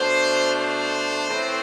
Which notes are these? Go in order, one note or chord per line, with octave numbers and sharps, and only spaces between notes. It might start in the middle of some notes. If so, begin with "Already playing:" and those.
Already playing: B2 A3 D4 C5
C5
A2 E3 A3 C4